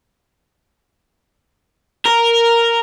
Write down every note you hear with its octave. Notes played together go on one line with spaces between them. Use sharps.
A#4